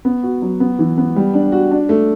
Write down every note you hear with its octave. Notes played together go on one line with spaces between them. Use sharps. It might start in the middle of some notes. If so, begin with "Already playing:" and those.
B3
F#4
F#3
B3
E3
B3
G3
D4
F#4
D4
A3